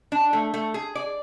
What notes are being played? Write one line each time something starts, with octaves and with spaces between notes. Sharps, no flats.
D4
A3
A3
G#4
D5